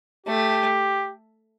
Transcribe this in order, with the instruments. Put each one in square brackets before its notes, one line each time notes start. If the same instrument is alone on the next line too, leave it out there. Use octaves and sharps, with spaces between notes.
[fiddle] A3 [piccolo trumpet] G4